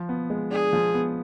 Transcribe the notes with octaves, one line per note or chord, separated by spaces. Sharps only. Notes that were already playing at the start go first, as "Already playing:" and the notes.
Already playing: F3
B3
G#3
D4 G#4
F3
B3